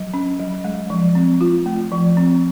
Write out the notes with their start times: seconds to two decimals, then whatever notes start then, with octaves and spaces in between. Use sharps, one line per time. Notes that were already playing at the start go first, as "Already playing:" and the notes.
Already playing: F#3
0.14 C#4
0.39 F#3
0.64 G#3
0.90 F3
1.15 C4
1.41 F4
1.66 A3
1.92 F3
2.17 C4